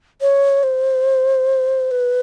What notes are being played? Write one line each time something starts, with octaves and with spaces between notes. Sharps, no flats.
C#5
C5
B4